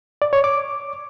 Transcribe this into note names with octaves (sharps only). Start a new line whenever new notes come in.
D5
C#5
D6